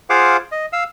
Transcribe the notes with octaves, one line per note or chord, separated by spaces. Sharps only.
F4 G#4 C5 F5 F#5 D6
D#5
F5 E6